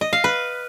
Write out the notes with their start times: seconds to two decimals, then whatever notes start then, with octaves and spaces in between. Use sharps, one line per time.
0.01 D#5
0.13 F5
0.24 B4